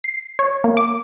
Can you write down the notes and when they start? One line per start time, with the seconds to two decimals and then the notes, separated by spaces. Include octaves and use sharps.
0.04 C7
0.39 C#5
0.64 A#3
0.77 D6